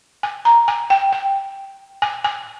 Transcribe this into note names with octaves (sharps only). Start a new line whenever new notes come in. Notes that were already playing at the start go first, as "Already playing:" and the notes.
G#5
A#5
G#5
G5
G5
G#5
G#5